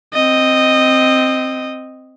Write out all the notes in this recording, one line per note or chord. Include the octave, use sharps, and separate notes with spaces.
C4 D#5